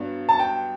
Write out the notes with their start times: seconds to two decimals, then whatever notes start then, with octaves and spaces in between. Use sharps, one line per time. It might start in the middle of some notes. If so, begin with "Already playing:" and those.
Already playing: G2 F#3 B3 D4
0.29 A5
0.39 G5